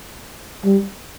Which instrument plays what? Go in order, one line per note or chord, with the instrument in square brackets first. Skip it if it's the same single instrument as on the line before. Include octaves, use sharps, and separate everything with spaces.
[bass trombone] G3